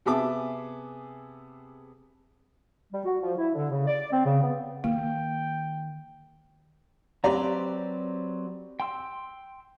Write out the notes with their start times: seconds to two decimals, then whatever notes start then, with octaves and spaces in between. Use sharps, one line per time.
0.05 C3 B3 G#4 E5 A5 D6
2.92 G3
3.05 F#4
3.21 F3
3.38 E4
3.54 D3
3.70 C#3
3.87 D5
4.12 C4
4.24 C#3
4.42 B3
4.84 D#3 A#3 G5
7.24 F#3 C4 G4 B4 D5 A#5
8.80 G5 C6 E6